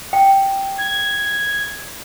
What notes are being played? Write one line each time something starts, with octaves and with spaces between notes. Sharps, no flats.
G5
G#6